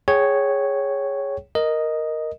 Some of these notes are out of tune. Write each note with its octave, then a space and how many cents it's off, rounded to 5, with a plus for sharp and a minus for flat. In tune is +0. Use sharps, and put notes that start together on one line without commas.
G#4 +0 C#5 +0 G5 -25
A#4 +0 D#5 +0